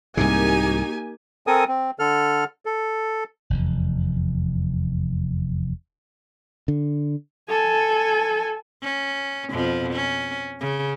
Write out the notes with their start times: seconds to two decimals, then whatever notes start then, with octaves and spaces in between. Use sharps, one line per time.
0.17 C2 G#2 C3 A#3 D#4 G4 G#5
1.47 C4 A4 A#4 G#5 D#6
1.68 C4
1.99 D3 A4 F6
2.66 A4
3.50 F1 E2
6.68 D3
7.49 A4 G#5
8.83 C#4
9.51 F2 B2 F3
9.94 C#4
10.60 C#3